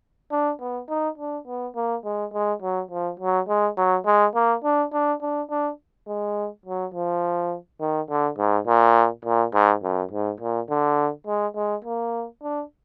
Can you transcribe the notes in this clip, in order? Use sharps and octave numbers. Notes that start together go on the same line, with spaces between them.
D4
B3
D#4
D4
B3
A#3
G#3
G#3
F#3
F3
F#3
G#3
F#3
G#3
A#3
D4
D4
D4
D4
G#3
F#3
F3
D#3
D3
G#2
A#2
A#2
G#2
F#2
G#2
A#2
D3
G#3
G#3
A#3
D4